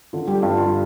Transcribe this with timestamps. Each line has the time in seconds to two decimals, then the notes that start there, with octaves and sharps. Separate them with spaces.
0.13 D3 F4
0.28 G3 G4
0.42 G2 F4
0.57 F4